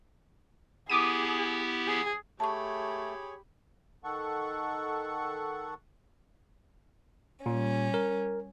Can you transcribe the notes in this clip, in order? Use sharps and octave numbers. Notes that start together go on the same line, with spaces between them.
B3 E4 G4 G#4 D6 D#6 D#7
G#4
A3 G4 G#4 C#5 A5 B5 C#6
D#3 A4 F#5 C#6
A#2 G3 C#4
A#4